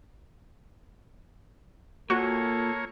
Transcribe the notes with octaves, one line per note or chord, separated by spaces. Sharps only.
A#2 A#3 F#4 A4 C#5